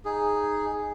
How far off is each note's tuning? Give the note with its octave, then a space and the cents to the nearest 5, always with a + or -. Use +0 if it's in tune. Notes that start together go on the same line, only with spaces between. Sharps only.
D#4 +0 G#4 +0